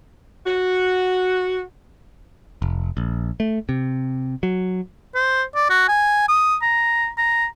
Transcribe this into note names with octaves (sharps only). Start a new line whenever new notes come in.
F#4
F1
A#1
A3
C3
F#3
C5
D5
F#4
G#5
D#6
A#5
A#5